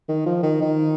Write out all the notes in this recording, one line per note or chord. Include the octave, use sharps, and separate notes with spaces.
D#3
F3
D#3
D#3